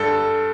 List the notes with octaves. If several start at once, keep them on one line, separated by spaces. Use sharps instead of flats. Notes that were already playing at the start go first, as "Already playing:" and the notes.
Already playing: G2 A4